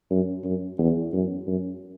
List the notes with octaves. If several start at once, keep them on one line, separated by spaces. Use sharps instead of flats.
F#2
F#2
E2
F#2
F#2